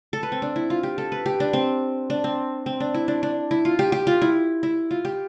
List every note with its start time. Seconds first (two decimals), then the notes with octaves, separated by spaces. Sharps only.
0.13 A4
0.23 B4
0.32 C4
0.42 D4
0.56 E4
0.70 F4
0.83 G4
0.98 A4
1.12 B4
1.26 G4
1.40 D4
1.53 C4
2.10 D4
2.24 C4
2.66 C4
2.80 D4
2.94 E4
3.08 D4
3.23 D4
3.51 E4
3.65 F4
3.79 G4
3.92 G4
4.07 F4
4.22 E4
4.63 E4
4.91 F4
5.05 G4